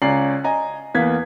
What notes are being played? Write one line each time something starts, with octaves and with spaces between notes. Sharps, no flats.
C#2 C#4 D5 A#5 C7 F#7
D#5 G#5 A#5
E2 A#3 B3 F5 G#6 B6